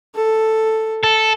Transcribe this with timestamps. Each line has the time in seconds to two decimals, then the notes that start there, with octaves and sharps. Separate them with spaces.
0.15 A4
1.04 A4